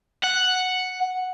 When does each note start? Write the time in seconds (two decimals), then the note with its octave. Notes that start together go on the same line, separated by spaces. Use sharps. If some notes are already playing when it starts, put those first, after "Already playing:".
0.24 F#5